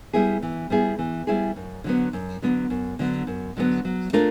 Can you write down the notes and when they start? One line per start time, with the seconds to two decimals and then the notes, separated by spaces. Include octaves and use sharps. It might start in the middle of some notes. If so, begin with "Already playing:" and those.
0.13 G3 B3 E4 G#4
0.42 E3
0.70 G3 B3 E4 G#4
0.99 E3
1.27 G3 B3 E4 G#4
1.56 F#2
1.84 D3 F#3 B3
2.13 F#2
2.42 D3 F#3 B3
2.70 F#2
2.99 D3 F#3 B3
3.27 F#2
3.57 D3 F#3 B3
3.85 F#3
4.13 A3 D4 F4 A#4